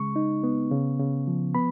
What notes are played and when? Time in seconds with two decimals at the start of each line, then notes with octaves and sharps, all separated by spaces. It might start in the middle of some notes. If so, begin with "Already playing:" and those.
Already playing: C#3 G#3 C#6
0.16 D#4
0.43 B3
0.71 C#3
0.99 C#3
1.28 F3
1.55 B3 B5